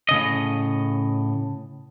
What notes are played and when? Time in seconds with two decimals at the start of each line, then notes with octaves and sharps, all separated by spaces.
0.09 A2 C#3 D#5